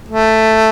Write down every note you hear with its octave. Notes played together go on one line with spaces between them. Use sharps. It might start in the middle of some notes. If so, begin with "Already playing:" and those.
A3